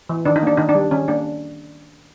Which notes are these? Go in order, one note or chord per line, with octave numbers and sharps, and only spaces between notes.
E3
D#3 D4
D#4
A#3 D4
D#3 D#4
D4
G3
D#3 C#4
A#3 D4